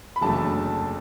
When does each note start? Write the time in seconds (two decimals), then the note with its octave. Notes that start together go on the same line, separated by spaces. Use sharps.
0.16 B5
0.21 F#1 E2 D3 F#3 A3 A5